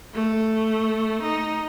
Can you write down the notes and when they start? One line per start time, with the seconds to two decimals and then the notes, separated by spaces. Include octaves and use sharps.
0.14 A3
1.22 D#4